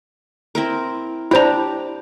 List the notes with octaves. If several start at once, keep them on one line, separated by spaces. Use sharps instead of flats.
C4 E4 A#4
D4 E4 G4 C5 A#5